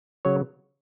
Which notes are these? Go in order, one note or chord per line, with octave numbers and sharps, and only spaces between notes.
C#3 F#3 C#5